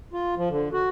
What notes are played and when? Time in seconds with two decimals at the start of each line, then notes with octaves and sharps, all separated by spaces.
0.13 F4
0.37 F3
0.49 D3
0.73 F#4